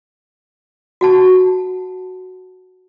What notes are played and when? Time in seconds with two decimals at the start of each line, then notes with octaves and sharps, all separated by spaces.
1.01 F#4 F#5 A5